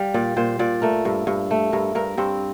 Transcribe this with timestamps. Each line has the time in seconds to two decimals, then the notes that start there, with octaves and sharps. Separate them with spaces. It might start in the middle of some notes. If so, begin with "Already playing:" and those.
Already playing: G3 F5
0.14 A#2 D5
0.37 A#2 C5
0.59 A#2 D5
0.82 A3 A#4
1.05 G2
1.27 G2
1.51 A3
1.72 G2 A#4
1.95 G2 A#4
2.18 G2 C4